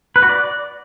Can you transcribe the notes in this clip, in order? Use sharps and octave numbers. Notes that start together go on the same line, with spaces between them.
B4
F#4
D5